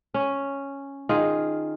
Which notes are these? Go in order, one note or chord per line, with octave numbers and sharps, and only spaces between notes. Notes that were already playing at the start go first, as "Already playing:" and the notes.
C#4
D#3 F4 G#4